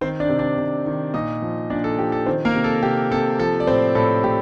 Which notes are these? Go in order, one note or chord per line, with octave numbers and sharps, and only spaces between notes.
D#3 C4 C5
D4 D5
C3
D4 D5
C3
D#3
A#2 D#4 D#5
F3
A#2 D4 D5
A4
F3 G4
A4
D#3 C4 C5
A#3 A#4
C3
A4
C3 G4
C3 A4
F3 A4
D5
A2 C4 C5
A2 A4
A2 G4